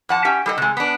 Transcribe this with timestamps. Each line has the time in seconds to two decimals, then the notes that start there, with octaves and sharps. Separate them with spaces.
0.09 F2 F#5 A5
0.25 C#4 G4 E5
0.46 G3 A4 D#5
0.58 C3 G#3
0.77 B3 D4